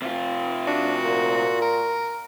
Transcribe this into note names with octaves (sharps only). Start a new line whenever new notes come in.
C3 F4
D4 F#4
A#2
A#4